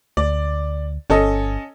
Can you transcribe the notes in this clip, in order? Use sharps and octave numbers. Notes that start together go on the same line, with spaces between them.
D2 D5
G1 C#4 A4 D#5